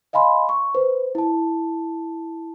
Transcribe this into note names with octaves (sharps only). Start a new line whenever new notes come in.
D#5 F5 G#5 B5 C6
C#6
B4 C5
E4 A5